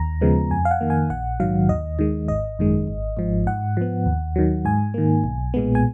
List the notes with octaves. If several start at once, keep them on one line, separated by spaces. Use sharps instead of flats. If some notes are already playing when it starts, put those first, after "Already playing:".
Already playing: D#2 A#5
C#3 F3 G#3 B3
F2 G#5
F5
F#5
D#3 A#3
G#5
A#1 F#5
G#2 D#3 F#3 F5
D#2 D#5
D#3 G#3
G#1 D#5
F#2 D#3 G#3
G#1
G#2 F3
G#2 F#5
F3 B3
D#2
D#3 F#3
G#2 G#5
D#3 A#3
B1
A#2 G#3 B3
G#5